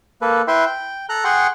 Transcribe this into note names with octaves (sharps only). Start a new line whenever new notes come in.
A#3 A4 B4
E4 B4 E5 G5 C6
G5
A4 A#5 F#6
G#4 F#5 G5 C6 C#6